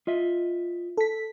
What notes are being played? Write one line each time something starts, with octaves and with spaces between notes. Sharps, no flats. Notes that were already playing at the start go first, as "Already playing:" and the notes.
F4 D#5 E5
A4 B6